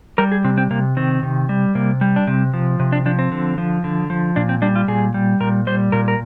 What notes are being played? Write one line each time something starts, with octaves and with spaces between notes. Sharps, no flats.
G3 A#4
G#4
C3 C4
C4
C3 A#3
D#3 C4
C3
G3
C3 A#3
G3
D4
C3 C4
F3
C3
D4
F3 D4
C4
D3
F3
D3
F3
A#2 D4
C4
G3 D4
F4
A#2 G#4
G3
A#2 A#4
G3 C5
A#2 A#4
A#4